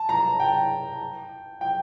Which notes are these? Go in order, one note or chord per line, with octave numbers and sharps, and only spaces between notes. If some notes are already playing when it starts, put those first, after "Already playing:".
Already playing: A5
A#5
G5
G5